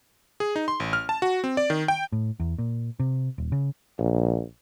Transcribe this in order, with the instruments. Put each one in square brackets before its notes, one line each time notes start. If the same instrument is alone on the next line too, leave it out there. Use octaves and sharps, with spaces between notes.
[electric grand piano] G#4
D#4
C6
A1
F6
A5
F#4
C4
D5
D#3
G5
[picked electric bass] A2
E2
A#2
C3
D#1
C#3
[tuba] A#1